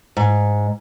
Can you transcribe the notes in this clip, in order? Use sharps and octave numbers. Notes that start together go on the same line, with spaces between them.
G#2